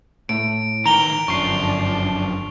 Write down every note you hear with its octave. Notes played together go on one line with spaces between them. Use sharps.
A2 D7
D#3 E3 A#5 D7 F7 G7
G1 F#2 F3 D4 C#6 C7